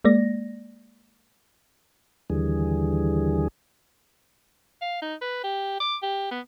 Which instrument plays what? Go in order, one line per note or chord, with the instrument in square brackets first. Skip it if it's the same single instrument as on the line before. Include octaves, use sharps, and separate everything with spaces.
[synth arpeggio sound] G#3 A#3 D5 A#6
[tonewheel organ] D#2 D3 E3 G3 G#4
[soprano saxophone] F5
D#4
B4
G4
D6
G4
B3